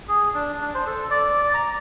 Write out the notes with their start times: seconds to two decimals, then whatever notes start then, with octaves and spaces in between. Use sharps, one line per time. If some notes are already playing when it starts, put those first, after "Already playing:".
0.08 G#4
0.34 D4
0.61 D4
0.75 C5
0.87 A4
1.10 D5
1.54 A#5